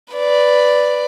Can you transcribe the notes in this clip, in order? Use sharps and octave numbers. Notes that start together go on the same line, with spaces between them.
B4 D5